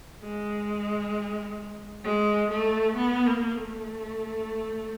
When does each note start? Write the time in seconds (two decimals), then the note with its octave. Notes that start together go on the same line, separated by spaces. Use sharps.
0.22 G#3
2.05 G#3
2.51 A3
2.97 B3
3.27 A#3
3.57 A3